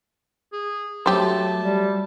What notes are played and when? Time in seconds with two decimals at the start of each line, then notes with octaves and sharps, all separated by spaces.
0.53 G#4
1.06 F#3 A3 G4 C5 A5
1.59 G3